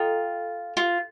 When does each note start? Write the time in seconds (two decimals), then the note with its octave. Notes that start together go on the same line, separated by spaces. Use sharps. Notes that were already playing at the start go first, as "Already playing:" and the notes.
Already playing: F4 A4 D#5 G5 A#5
0.77 F4